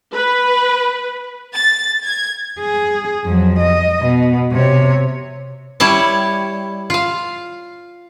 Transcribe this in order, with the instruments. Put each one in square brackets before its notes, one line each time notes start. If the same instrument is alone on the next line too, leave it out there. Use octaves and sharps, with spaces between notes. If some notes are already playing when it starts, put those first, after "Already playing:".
[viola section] B4
[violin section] A6
G#6
[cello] G#4
F2 F#3
D#5
B2
C3 C#5
[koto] G3 E4 C#5 A5
F4 F5